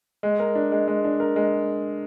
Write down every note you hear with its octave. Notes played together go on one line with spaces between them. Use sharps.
G#3
A#4
D4
G#3
G#3
D4
A#4
G#3